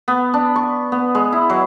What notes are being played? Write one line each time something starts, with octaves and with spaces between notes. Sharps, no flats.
B3
D4
C#6
B3
G#3
E4
F#3